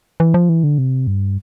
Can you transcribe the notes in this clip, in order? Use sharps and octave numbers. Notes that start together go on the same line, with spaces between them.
E3
F3
E3
D3
C3
G2